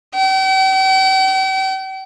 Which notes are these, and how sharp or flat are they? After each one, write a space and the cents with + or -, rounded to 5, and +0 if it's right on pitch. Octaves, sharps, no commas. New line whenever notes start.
G5 -45